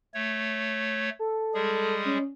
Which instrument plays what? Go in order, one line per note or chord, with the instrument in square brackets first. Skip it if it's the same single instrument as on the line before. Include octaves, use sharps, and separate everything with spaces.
[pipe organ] A3 C#5
[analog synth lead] A4
[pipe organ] G3 G#3 G#4
[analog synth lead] C#4